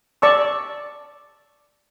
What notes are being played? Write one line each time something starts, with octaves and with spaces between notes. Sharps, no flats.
D5 A5 C#6 E6